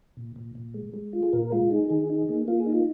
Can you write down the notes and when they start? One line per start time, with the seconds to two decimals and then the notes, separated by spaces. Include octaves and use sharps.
0.17 A#2
0.36 A#2
0.55 A#2
0.74 G#3
0.94 G#3
1.13 F4
1.23 G#4
1.33 A#2 A#4
1.52 G#3 F4
1.70 D#4 G#4
1.90 D#3 G#4
2.10 D#4
2.29 A#3
2.48 A#3 F4
2.60 G#4
2.66 D#4
2.73 F4